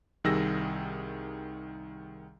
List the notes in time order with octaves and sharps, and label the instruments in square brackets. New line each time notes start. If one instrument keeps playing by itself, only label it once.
[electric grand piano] C2 D#3 G3 G#4 E6 A#6